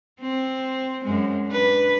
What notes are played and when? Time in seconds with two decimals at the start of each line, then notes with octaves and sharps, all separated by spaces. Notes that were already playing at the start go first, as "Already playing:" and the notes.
0.21 C4
1.05 F#2 G#3
1.47 D4 B4